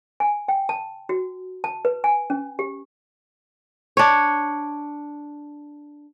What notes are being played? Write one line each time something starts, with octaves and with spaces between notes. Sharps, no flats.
G#5
G5
A5
F#4
A5
B4
G#5
C#4
G4
D4 C#5